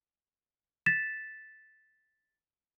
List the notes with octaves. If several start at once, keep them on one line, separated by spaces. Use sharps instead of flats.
A6 B6 E7